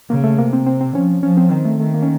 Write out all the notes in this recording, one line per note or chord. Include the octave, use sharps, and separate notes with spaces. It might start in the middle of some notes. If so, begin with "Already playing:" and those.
C#3 A#3
A3
C3 A#3
C4
C4
C4
F3 C#4
F3 C#4
C4
D#3 C4
A3
D#3 A3
A#3
C#4